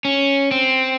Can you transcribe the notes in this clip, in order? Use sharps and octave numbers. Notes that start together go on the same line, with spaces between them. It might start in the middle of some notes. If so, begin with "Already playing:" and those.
C#4
C4